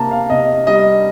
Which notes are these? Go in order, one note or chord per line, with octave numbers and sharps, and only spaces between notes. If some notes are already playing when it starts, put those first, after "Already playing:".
Already playing: C3 A#3 A5 A#5
F5
C3 D#5
G3 D#5